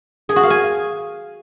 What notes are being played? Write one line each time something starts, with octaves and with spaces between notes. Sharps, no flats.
G#4
F#4
F5
G#5